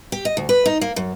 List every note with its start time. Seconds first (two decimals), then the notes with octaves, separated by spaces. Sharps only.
0.12 G4
0.25 D#5
0.37 D2
0.49 B4
0.66 D#4
0.81 A#3
0.96 F#2